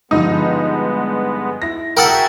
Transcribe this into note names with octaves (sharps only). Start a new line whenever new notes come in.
G2 D3 F3 G#3 B3 D#4
E4 A#6
F#4 G#4 A#4 E5 F#5 G5 A5 E6